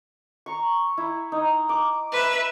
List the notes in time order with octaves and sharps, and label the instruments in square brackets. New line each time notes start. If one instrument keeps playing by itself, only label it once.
[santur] A#5 C#6
E4
D#4
D6
[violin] B4 E5